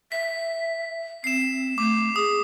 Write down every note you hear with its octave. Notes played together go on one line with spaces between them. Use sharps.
E5 B6
C4 C7 E7
A3 D6
G#4 D#6